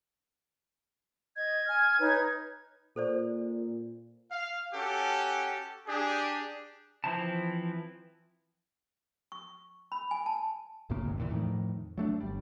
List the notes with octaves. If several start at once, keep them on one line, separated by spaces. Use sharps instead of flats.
D#5 G#6
G#5 F6
D#4 B4 C#5
A#2 A4 C5 D5
F5
C#4 F#4 G4 A4
D4 G4 G#4
E3 F3 C4 E4 A5
C#6
B5
G#5
A5
A#1 F#2 C#3 A#3
G1 D2 G#2 C3
D#2 A#2 E3
F2 A2 D3 D#3
F#3 A3 D4
G1 G3